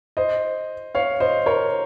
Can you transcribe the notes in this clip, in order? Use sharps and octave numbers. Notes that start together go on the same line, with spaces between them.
C5 D#5
C#5 F5
C5 D#5
A#4 C#5